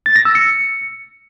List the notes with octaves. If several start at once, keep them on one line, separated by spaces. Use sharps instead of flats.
A6
A#6
E6
C#7